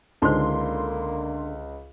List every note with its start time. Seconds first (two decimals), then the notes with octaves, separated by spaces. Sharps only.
0.22 C#2 D3 A#3 D#4 C5 C6